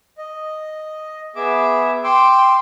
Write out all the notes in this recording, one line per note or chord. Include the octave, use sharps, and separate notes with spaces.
D#5
B3 G#4 E5 D6
G5 C6 D6 E6